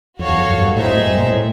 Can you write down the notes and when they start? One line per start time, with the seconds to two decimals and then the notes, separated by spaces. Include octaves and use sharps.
0.18 F2 F#4 A4 C#5 F5
0.28 E2
0.38 F2
0.49 F#2
0.58 G2
0.68 G#2
0.77 A2 C4 D#4 G#4 C5 E5
0.88 G2
0.97 F#2
1.06 G2
1.16 A#2
1.27 A2